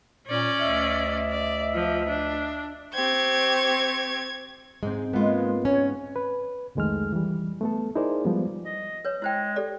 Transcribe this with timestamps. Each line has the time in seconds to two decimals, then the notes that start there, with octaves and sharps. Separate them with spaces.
0.27 A#2 C#4 D5
0.60 D2 D#5 E5
1.31 D5
1.74 F3
2.09 D4
2.94 C4 G4 C#6 G#6
4.83 G#2 G#3 C4
5.13 G#3 A#3 B3 F4
5.65 C#4 C#5
6.16 B4
6.75 C2 F2 D#3 G#3 A3 F6
7.13 E3 G3
7.61 A3 B3 A4
7.95 D#4 E4 G#4 A#4 C5 D5
8.25 F3 G3 G#3 B3
8.66 D#5
9.05 B4 C#5
9.22 G#3 E4 C5 G5
9.56 G4 A4 D5